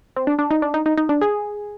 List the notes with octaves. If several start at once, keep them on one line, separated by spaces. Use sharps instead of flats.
C4
D4
D4
D#4
D4
D#4
D#4
D#4
D4
G#4